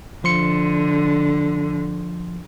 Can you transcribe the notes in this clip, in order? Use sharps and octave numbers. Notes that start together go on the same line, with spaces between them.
D3 F3 C6 C#7